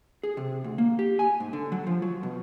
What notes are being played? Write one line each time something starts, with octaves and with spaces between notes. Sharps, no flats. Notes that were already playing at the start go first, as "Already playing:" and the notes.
G#4
C3
D2
A#3
G4
G#5
G#2
D3
F#3
F3
F#3
B2